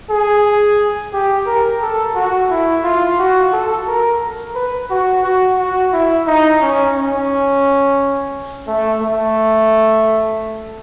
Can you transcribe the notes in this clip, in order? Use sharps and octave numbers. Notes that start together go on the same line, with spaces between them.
G#4
G4
A#4
A4
F#4
E4
F4
F#4
A4
A#4
B4
F#4
F#4
F#4
E4
D#4
C#4
C#4
A3
A3